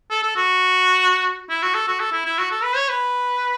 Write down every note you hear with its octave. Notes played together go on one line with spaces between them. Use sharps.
A4
A4
F#4
E4
F#4
A4
F#4
A4
E4
E4
F#4
A4
B4
C#5
B4